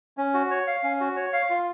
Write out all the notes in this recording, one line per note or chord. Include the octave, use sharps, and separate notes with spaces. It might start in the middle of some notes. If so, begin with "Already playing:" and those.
C#4
F#4
C#5
F5
C#4
F#4
C#5
F5
F4